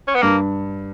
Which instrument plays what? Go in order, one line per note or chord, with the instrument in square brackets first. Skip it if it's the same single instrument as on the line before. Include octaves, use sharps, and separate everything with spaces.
[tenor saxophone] C#4
B3
[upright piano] G2 [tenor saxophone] A#3